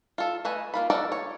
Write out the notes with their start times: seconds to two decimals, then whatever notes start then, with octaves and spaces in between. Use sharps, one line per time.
0.18 F4 A4
0.45 A3 B4 D#5 G#5
0.74 A#3 F4 B5
0.90 D#4 F#4 A4 A#4 D5
1.12 C#5